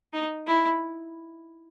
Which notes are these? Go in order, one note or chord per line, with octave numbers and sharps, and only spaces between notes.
D#4
E4